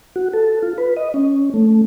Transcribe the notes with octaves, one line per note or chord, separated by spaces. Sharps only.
F#4
A4
F4
B4
D#5
C#4
A3